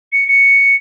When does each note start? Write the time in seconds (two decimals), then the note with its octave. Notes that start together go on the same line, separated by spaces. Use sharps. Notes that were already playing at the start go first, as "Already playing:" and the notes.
0.13 C#7
0.28 C#7